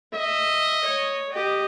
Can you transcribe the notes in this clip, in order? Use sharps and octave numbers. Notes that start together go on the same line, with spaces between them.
D#5 E5
C#5
G4 D#5